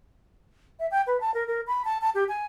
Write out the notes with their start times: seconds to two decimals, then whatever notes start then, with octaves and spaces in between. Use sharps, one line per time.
0.80 E5
0.91 G5
1.07 B4
1.21 A5
1.34 A#4
1.47 A#4
1.67 B5
1.85 A5
2.01 A5
2.15 G4
2.28 G#5